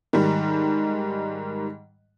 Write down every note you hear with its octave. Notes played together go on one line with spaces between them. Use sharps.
G#2 D#3 G3